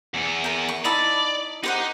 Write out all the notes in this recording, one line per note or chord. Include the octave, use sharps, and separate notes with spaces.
E2 B3
A#4 G5
C#6
D#4 E4 D5 A5
D#4 G4 C5 F#5